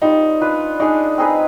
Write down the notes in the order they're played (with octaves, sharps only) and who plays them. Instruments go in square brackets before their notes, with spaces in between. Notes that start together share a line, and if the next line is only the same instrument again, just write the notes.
[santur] G3 C4 F4 [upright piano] D#4
[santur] D4 F4 B4
[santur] D4 G#4 D5 [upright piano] D#4
[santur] C4 D#4 G#4 B4